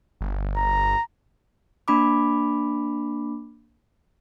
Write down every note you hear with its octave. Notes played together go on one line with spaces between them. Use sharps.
G1
A#5
A#3 D4 B5 D6